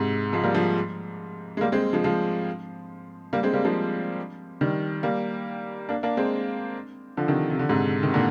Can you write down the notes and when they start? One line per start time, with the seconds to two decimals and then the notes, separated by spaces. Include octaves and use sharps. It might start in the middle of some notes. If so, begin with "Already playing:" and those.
Already playing: G#2 C3
0.33 F3 G#3
0.44 G3 A#3
0.55 F3 G#3
1.57 G#3
1.61 G3 A#3
1.72 G#3 C4
1.93 F3 G#3
2.04 F3 G#3
3.33 G3 A#3
3.43 G#3 C4
3.54 G3 A#3
3.65 F3 G#3
4.61 D#3 G3
5.03 G3 A#3
5.89 A#3 D4
6.03 A#3 D4
6.17 G#3 C4
7.17 D3 F3
7.28 C3 D#3
7.50 C3
7.59 D3
7.69 G#2 C3
8.03 C3 D#3
8.14 A#2 D3